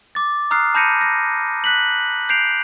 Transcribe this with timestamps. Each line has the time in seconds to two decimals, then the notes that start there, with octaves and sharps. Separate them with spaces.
0.15 D6 A6
0.51 A#5 D#6 F6 F#6 C7
0.74 A5 B5 G6 A#6 C#7 D#7
1.01 A#6
1.64 F#6 B6 F#7
2.29 G6 C7 D7 F7